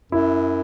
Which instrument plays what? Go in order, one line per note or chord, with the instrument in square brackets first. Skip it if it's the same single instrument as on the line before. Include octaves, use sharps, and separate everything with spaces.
[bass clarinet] F#2 [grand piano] E4